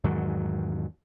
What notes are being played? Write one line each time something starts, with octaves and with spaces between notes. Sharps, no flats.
E2 G#2 D#3 F#3